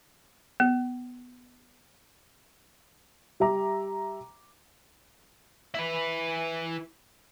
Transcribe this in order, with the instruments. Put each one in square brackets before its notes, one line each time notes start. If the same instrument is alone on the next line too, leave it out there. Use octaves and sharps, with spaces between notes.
[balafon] B3
[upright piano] G3 E5 A#5 D6
[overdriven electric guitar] E4 B4